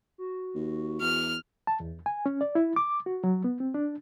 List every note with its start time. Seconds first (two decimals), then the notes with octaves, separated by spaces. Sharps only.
0.18 F#4
0.55 D#2
1.01 E2 F6
1.67 A5
1.80 E2
2.06 G#5
2.26 C#4
2.41 D5
2.55 E4
2.76 D6
3.06 F#4
3.24 F#3
3.44 B3
3.60 C4
3.74 D4